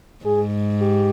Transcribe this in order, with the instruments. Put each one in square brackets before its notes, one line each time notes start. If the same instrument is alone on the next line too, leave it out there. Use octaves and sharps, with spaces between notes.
[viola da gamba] G#2 [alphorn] G#4
[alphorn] G4